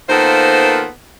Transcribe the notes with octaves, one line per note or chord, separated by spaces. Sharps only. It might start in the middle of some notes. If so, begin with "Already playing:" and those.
D#3 A#3 B3 F4 A4 C5